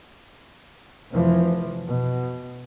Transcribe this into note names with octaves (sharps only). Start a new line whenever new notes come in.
F1 E3 F3
B2